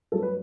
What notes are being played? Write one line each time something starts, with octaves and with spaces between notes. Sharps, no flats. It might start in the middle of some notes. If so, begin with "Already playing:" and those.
G2 F#3 A3 A4
B4